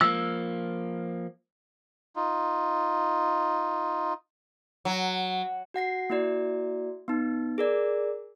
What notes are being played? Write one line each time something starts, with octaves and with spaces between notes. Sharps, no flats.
F3 A#3 E6
D#4 F4
F#3
F#4 F#5 A#6 C7
A#3 E4 F#4 D5
B3 D#4
G#4 A#4 D5